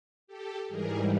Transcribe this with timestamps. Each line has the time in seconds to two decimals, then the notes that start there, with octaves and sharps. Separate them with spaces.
0.27 G4 A4
0.68 G#2 E3 G3 G#4 A#4